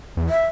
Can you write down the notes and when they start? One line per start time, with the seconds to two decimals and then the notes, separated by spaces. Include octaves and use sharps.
0.17 E2
0.29 E5